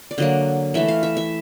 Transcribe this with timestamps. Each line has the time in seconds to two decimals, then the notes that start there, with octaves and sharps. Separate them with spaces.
0.11 D5
0.18 D3 F#3 A#3 D#5
0.74 E3 A3 E5
0.88 F5
1.03 E5
1.17 E5